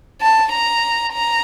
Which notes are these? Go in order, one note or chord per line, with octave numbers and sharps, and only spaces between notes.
A5
A#5
A#5